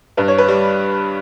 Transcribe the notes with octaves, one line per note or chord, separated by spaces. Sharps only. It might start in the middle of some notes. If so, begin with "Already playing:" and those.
G2 B4
C#5
B4
G3